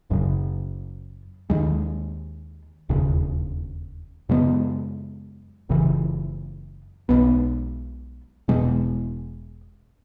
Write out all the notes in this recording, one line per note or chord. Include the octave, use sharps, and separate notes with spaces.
F#1 F#2 C#3
D#2 D#3 G#3
E1 D#2 C#3
F#2 C#3 G#3 B3
F#1 F#2 C#3 E3
B1 B2 G#3 B3
E1 E2 B2 G#3